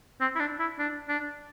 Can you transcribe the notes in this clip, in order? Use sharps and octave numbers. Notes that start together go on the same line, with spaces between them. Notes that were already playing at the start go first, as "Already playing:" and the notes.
C4
E4
D4
E4
D4
D4